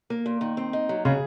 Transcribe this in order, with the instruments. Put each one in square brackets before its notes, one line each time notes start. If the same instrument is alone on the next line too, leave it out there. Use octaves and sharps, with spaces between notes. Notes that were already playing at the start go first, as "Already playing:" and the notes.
[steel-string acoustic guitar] A#3
A#2
D#3
C4
D#4
F#3
[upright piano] C#3 [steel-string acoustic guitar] G#4